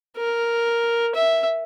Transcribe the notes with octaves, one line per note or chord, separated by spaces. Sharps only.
A#4
E5